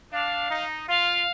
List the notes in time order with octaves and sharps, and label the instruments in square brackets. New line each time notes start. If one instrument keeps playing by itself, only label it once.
[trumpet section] D4 [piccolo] F5
[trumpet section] D#4
[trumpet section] F4 [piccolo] F5